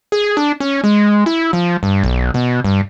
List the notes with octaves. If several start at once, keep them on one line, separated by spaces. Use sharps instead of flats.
G#4
D4
C#4
G#3
E4
F3
G2
B1
B2
G2